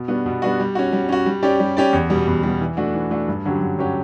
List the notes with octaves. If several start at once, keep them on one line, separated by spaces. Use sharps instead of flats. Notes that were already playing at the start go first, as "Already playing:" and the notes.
Already playing: B2
G3 B3 D4 F#4
B2
G3 B3 D4 F#4
G3
C#4 F#4
G3
C#4 F#4
G3
C#4 G4 D5
G3
C#4 G4 D5
E2
B2 G3
E2
B2 G3
E3
A3 D4 F#4
E3
A3 D4 F#4
G2
D3 F#3 C#4 G4
G2
D3 F#3 C#4 G4